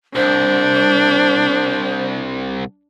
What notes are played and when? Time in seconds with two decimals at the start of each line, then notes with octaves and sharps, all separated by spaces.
0.15 C2 D4 C5